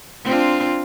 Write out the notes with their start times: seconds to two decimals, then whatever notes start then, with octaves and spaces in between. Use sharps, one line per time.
0.25 C4 D4 F4